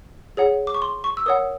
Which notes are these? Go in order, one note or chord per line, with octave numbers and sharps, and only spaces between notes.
G#4 C#5 F#5
D6
C#6
C6
C#6
E6
A#4 C#5 F#5 D#6